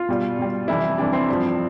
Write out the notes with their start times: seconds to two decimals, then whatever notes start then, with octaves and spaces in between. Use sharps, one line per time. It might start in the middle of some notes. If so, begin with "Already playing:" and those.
Already playing: F4
0.09 B2 G3
0.39 B2 G3
0.68 F2 C3 E3 G3 E4
0.98 F2 C3 E3 G3 D4
1.13 C4
1.28 G2 F3